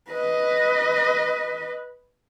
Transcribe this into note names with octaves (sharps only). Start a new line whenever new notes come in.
B4 D#5